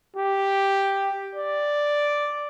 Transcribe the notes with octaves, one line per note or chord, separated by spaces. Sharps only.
G4
D5